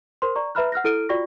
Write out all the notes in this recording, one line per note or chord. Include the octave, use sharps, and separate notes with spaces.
A#4 C5 C6
D5 A#5 C#6
B4 E5 A#5 B5 F6 F#6
F#5 F6 F#6 A#6
E4 A4 F6 D7 D#7
F4 F#4 D5 G5 C#6 A#6